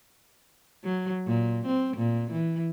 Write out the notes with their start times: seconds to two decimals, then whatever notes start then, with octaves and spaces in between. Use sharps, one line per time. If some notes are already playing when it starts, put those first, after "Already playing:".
0.84 F#3
1.27 A#2
1.66 C4
1.97 A#2
2.31 E3